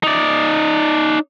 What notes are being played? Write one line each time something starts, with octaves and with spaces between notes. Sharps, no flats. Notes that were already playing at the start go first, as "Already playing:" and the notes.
D#4 D5